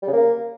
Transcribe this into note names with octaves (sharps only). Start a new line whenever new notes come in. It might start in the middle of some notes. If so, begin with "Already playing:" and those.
G3
C#3
A#3